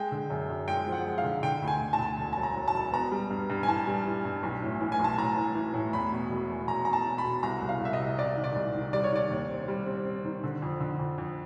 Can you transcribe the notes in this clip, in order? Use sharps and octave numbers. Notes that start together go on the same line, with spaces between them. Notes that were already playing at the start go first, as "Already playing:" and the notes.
Already playing: G#3 G5
D3
F#2
F#2
G#3 G5
F3
F#5
G#3
F5
D3
D3 G5
D2
G#5
D2
A5
D2
E1
F#3 A5
A#5
F#3
A5
E1
B3 A#5
G3
G2
G2
G#5
E3 A5
G3
E3
G2
B1
A2
E3
G#5
B1
A5
A2 A#5
E3
E3
A2
E2 B5
B2
E1
E2
E1 A#5
B2 A#5
A5
B2
B5
B2
C2 A#5
C2
F5
C2 E5
D#5
C3
C3 D5
D#3
D5
C2
D#3
G3 D5
C#5
D#3 D5
D#2
C4
G3
C4
C4
D#3
D3
F2
D3
F2
F2